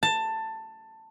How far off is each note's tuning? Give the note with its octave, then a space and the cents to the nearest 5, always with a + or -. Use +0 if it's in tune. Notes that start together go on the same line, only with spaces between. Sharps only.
A5 +15